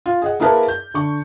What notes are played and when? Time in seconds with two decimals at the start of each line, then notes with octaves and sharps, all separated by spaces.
0.06 F4
0.22 G#4 D#5 F#5
0.40 A#3 E4 G#4 A#4 B4 A5
0.68 G6
0.94 D3 C#6